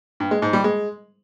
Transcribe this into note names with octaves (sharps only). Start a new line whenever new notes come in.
G2
G#3
G#2
G3
G#3